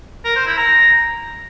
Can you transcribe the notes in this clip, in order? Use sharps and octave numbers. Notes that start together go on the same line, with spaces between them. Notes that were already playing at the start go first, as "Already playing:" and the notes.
A#4
C5
E4
A#5